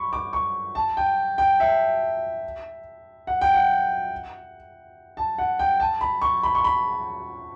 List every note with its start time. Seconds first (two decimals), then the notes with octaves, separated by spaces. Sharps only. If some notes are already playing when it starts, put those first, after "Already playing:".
Already playing: B5 C#6
0.13 D6
0.33 C#6
0.75 A5
0.97 G5
1.38 G5
1.60 E5
3.27 F#5
3.41 G5
3.54 F#5
5.17 A5
5.38 F#5
5.59 G5
5.80 A5
6.01 B5
6.22 C#6
6.43 B5
6.55 C#6
6.64 B5